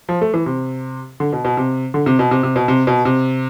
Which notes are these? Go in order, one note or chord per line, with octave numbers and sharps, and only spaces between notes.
F3
A3
E3
C3
D3
B2
B2
C3
D3
C3
B2
C3
C3
B2
C3
B2
C3